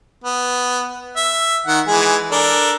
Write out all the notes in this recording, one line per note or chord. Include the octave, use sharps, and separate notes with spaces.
B3
E5
D#3 F#5
E3 G#3 G#4
D4 A4 A#4